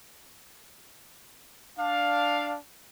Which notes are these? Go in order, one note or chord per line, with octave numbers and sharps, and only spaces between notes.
D4 F5